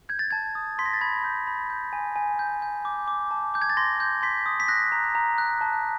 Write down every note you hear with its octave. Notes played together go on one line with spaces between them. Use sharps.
G6 G#6
A6
A5 G#6
D#6
C6 B6
A#6
A6
B5 G#6
G6
B5
G6
G#5
G#5
G6
G6
D6
D6
A5
D6 G6
G#6
A6
C6 A#6
G6
C6 B6
D#6
B6
F#6 A#6
A#5
A#5
F#6
A5